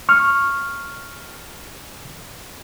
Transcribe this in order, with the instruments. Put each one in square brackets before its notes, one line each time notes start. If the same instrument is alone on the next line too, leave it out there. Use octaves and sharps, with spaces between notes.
[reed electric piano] C#6 F6